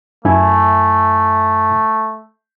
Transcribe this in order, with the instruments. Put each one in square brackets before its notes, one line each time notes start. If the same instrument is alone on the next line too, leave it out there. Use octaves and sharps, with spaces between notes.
[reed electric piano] F#2 E4 G#5 [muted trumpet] A3